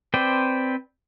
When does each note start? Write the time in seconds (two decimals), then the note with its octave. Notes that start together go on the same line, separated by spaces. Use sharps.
0.14 C4 B4 C5 D5 G5